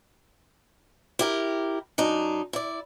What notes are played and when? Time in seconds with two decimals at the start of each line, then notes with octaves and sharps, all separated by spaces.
1.19 E4 G4 A#4
1.98 F#2 D4 D#4
2.53 E4 D5